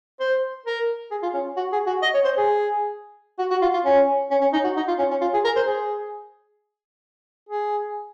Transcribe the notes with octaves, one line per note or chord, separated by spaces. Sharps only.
C5
A#4
G#4
F4
C#4
F#4
G#4
F#4
D#5
C#5
C5
G#4
F#4
F#4
F4
F4
C#4
C#4
C#4
D#4
F#4
D#4
F4
C#4
C#4
F4
G#4
A#4
C5
G#4
G#4